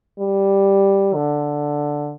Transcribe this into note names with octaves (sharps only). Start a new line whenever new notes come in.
G3
D3